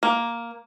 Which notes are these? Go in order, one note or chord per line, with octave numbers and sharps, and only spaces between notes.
A#3